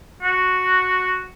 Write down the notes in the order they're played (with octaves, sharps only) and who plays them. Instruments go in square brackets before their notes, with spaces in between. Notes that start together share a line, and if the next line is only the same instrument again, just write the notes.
[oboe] F#4